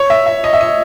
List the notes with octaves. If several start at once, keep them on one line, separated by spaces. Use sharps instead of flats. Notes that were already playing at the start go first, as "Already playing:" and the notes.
Already playing: C#5
E5
E5
D#5
E5
D#5